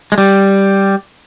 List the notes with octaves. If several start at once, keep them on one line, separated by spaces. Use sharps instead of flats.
G#3
G3